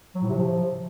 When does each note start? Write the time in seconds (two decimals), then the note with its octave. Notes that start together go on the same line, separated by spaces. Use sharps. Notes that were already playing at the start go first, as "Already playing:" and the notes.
0.15 F#3
0.22 A2
0.29 C3
0.36 F3